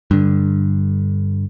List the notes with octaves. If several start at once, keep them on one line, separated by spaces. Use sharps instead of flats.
G2 D3